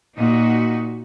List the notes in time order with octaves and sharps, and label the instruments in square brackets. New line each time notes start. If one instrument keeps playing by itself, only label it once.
[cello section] A#2 D#4 F#4